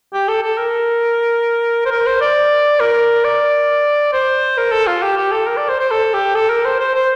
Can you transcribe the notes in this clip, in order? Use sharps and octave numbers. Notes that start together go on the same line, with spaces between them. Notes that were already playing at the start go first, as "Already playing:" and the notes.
G4
A4
A4
A#4
C5
A#4
C5
D5
A#4
D5
C5
A#4
A4
F4
G4
G4
A4
A#4
D5
C5
C5
A4
G4
A4
A#4
C5
C5
C5